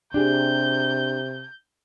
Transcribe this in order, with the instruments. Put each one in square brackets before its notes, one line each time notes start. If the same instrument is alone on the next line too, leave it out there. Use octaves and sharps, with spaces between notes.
[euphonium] C3 [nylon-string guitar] D4 G4 G#4 [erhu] G6